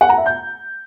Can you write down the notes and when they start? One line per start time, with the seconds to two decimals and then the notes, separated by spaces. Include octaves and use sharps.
0.01 F#5
0.09 A#5
0.18 E5
0.26 G6